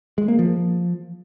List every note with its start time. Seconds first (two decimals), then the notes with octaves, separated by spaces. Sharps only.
0.18 G#3
0.28 A#3
0.39 F3